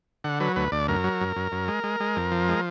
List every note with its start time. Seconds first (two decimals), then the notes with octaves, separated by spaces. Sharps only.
0.24 D3 F#5
0.40 F#3 B4
0.56 D2 B4
0.72 D2 D5
0.88 F#2 A#4
1.04 F#3
1.21 F#2
1.36 F#2
1.52 F#2
1.68 G#3
1.84 G#3
2.00 G#3
2.16 F2
2.32 F3
2.49 G#3